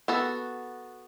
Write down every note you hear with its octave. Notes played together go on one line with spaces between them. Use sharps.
B3 F#4 A4